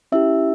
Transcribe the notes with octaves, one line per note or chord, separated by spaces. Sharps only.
C#4 E4 G4 E5 E6